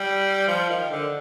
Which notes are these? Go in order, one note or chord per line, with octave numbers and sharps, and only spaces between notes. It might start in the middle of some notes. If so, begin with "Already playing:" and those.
Already playing: G3
F3
D#3
D3